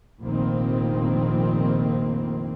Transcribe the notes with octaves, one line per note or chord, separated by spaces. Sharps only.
F1 A#1 A#2 D#3 A#3 C4